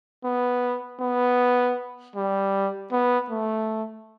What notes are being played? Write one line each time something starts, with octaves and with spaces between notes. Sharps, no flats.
B3
B3
G3
B3
A3